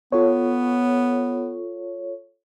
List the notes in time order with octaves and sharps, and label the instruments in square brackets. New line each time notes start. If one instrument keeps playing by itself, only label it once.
[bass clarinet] B3 [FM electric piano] F4 A4 C#5